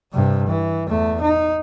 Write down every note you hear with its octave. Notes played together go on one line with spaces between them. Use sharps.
G2 C3
E3
E2 A3
D#4